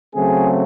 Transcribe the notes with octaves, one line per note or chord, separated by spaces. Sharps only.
C#3 F#3 A3 C4 G#4